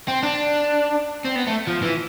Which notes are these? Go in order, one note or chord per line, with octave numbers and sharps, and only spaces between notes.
C4
D4
C4
B3
A3
F3
E3